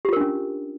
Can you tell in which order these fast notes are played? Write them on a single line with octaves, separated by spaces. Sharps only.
G4 F4 A#4 D4 C#4